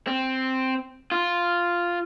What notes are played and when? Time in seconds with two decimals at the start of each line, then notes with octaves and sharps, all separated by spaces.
0.07 C4
1.12 F4